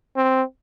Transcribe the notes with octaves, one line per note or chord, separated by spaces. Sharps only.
C4